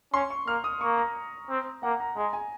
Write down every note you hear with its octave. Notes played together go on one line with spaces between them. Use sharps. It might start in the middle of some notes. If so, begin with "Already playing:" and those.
C#4 C6
C#6
A#3 F6
D#6
A#3 C#6
A#5
C4
A#3 F#5
A#5
G#3 A#5
G#5